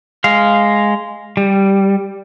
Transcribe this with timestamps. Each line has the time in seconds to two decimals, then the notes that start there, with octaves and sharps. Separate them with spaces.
0.24 G#3 F5
1.37 G3